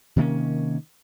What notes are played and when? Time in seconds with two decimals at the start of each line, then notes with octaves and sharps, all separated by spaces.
0.16 C3 D#3 A#3 C#4